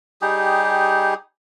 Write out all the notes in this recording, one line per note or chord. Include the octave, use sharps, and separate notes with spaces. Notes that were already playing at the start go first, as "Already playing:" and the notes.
G3 D#4 G4 G#4